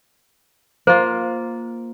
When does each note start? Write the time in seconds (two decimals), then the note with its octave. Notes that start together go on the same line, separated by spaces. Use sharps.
0.87 A#3 F4 C5